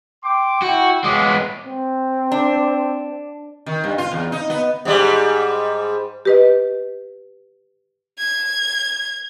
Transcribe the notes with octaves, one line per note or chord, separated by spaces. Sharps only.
G5 C6 D6
E4 F#4 F#5 G5
G#3 B3 F4 C#5 D6
C4
D4
D#3
G2
F4
E2
D#4
B3
G#2 G3
G4 B4 D#5
G#6